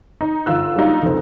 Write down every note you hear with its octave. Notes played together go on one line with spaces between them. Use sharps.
D#4
G1 F4 E6 F#6
F#3 G3 A#3 D4 D#4 F4
F1 C#2 C4